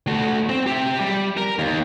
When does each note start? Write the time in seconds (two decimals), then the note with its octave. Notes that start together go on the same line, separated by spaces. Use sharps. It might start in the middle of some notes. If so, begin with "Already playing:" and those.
0.08 A3 F#4
0.49 C4
0.67 G4 E5
1.01 G3
1.37 A#4
1.59 D#2